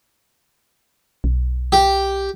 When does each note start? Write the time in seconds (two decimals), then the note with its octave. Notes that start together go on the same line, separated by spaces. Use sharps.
1.24 B1
1.72 G4